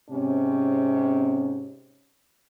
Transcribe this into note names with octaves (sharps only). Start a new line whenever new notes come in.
G#2 C3 C4 C#4